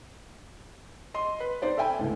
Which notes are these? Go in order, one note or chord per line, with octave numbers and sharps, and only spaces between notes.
D#5 C6
B4
D#4 C5 D5
A4 E5 G5 G#5 B5
C#2 A2 D3